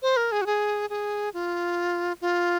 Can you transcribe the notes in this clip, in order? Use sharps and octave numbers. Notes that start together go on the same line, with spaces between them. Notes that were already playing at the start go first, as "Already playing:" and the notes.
C5
A#4
G#4
F#4
G#4
G#4
F4
F4